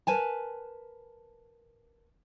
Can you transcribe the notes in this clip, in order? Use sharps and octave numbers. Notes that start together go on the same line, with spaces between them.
A#4 B4 G#5 A5